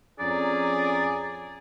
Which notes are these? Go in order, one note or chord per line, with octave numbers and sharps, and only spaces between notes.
F2 C#4 G#4 D5 A#5